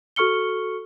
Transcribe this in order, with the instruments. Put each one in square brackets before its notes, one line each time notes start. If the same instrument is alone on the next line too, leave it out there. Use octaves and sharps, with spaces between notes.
[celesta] F#4 A4 C#6 F6 C#7 G7